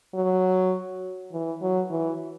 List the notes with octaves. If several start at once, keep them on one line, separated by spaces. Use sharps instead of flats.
F#3
E3
F#3
E3